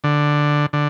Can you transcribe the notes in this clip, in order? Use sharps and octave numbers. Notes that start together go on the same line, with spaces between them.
D3
D3